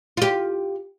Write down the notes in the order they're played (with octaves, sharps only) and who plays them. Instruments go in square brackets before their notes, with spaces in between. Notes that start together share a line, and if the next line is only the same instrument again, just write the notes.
[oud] F4 G4